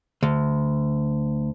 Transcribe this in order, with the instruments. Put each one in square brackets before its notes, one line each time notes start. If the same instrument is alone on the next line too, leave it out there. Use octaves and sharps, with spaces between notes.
[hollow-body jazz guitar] D2